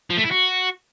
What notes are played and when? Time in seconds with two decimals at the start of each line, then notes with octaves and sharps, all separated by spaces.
0.10 F3
0.17 A3
0.24 E4
0.31 F#4